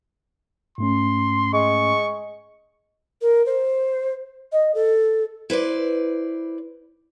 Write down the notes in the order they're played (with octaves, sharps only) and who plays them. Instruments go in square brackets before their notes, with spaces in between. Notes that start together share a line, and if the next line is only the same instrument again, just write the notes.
[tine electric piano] G#2 A3 C#4 [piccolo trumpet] C6
[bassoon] G#3 [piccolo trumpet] C#6
[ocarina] A#4
C5
D#5
A4
[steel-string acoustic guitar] E4 B4 C5 D5